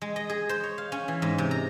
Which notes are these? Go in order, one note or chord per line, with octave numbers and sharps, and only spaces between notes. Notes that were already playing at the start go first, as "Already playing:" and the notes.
G#3
D#5
G#4
C5
C#5
F5
C#4
E3
G#2
C3
A#5